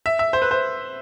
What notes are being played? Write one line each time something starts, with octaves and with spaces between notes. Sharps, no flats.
E5
E5
C5
B4
C5